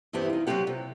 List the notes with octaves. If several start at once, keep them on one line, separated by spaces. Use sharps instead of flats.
E2 G2 E3 B3 C4 G4
D#4 F4
F#3 C4 F4 G4 F#5
C3